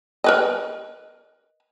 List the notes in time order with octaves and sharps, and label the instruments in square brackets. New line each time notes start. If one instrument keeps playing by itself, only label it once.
[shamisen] A#4 B4 D#5